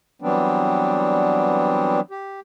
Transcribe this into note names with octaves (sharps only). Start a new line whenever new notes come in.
E3 F#3 G3 B3 C4 D4
G4